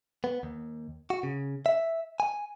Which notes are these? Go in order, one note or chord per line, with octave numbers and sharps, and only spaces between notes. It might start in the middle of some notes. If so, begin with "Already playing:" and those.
B3
D#2
F#4
C#3
E5
G#5